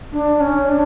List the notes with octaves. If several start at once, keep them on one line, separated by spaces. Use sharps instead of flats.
D4
C#4
D4